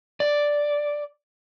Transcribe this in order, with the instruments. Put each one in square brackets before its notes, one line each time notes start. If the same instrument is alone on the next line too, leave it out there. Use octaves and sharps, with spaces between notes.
[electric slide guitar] D5